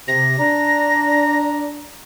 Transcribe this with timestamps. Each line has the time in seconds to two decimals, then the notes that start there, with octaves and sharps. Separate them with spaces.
0.08 C3 A#6
0.39 D4 A#5